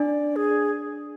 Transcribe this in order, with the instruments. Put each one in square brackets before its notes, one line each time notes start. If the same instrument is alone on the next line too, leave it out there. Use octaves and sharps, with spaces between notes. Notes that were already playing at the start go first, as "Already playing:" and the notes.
Already playing: [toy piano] D4 [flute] D5
[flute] G#4